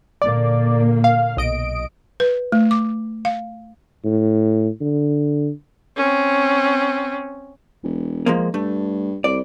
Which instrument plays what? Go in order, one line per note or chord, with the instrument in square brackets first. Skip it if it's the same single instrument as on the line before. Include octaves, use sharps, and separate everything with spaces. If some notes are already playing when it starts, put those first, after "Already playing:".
[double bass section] A#2 D3 A#3 [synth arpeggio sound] D5
[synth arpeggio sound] F5
B1 D#5 D7
[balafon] B4
A3
D6
F5
[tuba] A2
D3
[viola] C4 C#4
[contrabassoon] E1
[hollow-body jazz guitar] F3 G#3 A#3
[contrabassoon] G2 [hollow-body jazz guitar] A3
[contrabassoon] C2 [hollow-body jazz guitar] D5